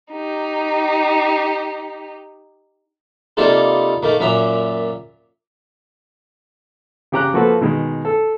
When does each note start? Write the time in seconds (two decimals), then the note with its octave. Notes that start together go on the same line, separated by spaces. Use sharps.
0.12 D#4 G4
3.37 C3 G3 A#3 D#4 F4 A4
4.03 D#3 A3 A#3
4.20 F#2 A#2 C#4 E5 A#5 D6
7.12 C#3 G4 A#5 F#6
7.33 F3 A#3 F#4 A4 B4
7.61 B2 D#3 G#3
8.05 A4